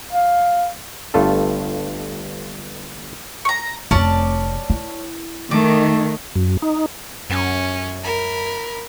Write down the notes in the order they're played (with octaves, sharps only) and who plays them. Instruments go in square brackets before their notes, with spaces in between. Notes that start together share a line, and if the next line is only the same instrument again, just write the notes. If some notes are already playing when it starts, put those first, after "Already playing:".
[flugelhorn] F5
[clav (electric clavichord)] G1 G2 A3 F4 A4
[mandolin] A#5 C#6
[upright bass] F1 C4 [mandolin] C#4 D5 A5
[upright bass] E4
[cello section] D#3 [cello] A3 [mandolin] D6
[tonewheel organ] F#2
D#4
[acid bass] F#2 [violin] C#4
[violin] A#4 B5